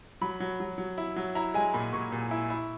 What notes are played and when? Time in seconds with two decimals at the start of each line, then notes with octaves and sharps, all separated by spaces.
0.21 F#3 B5
0.40 F#3
0.60 F#3
0.78 F#3
0.98 E4
1.16 F#3
1.35 E4 A#5
1.54 G#3 G#5
1.74 A#2 B5
1.93 A#2 C#6
2.12 A#2
2.31 E4
2.50 E4